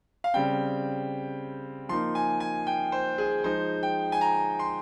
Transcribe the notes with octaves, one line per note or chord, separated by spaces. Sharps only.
F5
C#3 G3 C4 G5
F3 A#3 D#4 C6
G#5
G#5
G5
C5
G#4
F3 G#3 D#4 C5
G5
G#5
A#5
C6